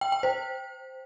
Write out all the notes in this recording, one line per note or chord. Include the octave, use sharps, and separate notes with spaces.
G5
G5
C5